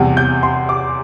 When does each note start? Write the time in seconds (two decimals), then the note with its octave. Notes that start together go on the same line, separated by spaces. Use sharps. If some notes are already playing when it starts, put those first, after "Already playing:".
Already playing: E2 C3 G3
0.17 G6
0.43 C6
0.69 D6